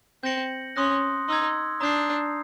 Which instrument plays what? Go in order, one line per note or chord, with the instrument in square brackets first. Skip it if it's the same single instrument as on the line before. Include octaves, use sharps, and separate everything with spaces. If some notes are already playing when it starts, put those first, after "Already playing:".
[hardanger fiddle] C4 [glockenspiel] G6 A#6 C#7 F#7
[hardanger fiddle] C#4 [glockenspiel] C6 D#6 F#6 A#6
[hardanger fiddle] D#4 [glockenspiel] C6 E6 G#6
[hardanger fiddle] D4 [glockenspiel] A#5 D#6 G6 C7